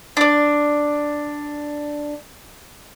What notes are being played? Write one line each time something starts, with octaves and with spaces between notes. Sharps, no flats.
D4 D5